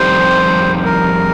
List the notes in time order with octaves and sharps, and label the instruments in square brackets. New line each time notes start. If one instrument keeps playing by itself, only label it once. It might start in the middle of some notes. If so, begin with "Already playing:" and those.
Already playing: [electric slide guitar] F2 D#3 G3 C4 G4 [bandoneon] C5
[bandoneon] A#4